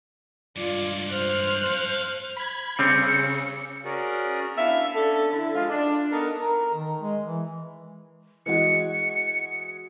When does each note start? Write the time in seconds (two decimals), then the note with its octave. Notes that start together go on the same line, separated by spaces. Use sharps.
0.56 G2 G#3 F4 D5
1.10 C5 F6 F#6
1.66 A4 F5
2.37 B5 G#6
2.79 C#3 G3 C4 C#7
3.85 C#4 F#4 G#4 A#4 D5
4.56 B3 D4 E4 E5 F5
4.95 C#4 D4 A4
5.31 D3 E4
5.55 G#3 F4
5.69 D4
6.11 B3 D#4 A4 A#4
6.40 A#4
6.74 D#3
6.99 G#3
7.26 E3
8.46 E3 G#3 F#4 C#7